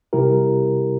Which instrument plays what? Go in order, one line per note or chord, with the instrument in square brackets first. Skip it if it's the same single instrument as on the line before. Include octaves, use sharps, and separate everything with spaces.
[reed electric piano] C3 G3 E4 G4 A#4